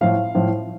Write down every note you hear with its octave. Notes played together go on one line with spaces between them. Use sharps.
A2 F3 F5
A2 F3